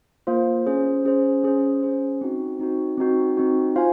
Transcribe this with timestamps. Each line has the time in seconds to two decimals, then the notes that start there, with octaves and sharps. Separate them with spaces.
0.27 A#3 F4 C5 F5
0.66 C#4 G#4 C5
1.05 C#4 G#4 C5
1.43 C#4 G#4 C5
1.83 C#4 G#4 C5
2.21 C4 D#4 F#4
2.59 C4 D#4 F#4
2.97 C4 D#4 F#4
3.37 C4 D#4 F#4
3.76 F4 C5 F5 G#5